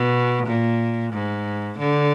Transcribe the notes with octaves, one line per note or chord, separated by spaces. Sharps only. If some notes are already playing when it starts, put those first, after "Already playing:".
Already playing: B2
A#2
G#2
D3